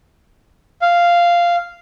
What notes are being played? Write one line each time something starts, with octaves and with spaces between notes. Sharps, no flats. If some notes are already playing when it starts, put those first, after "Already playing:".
F5